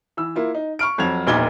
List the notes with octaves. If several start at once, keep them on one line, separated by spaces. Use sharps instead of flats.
E3 E6
A#3 E4 F4
D#4
C#6 F6 D7
F2 F3 F#3 G#6 F7
E1 A#1 A#2 D#4 G#6 G7